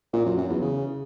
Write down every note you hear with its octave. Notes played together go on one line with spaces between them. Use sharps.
A#2
F#2
F#2
E2
C#3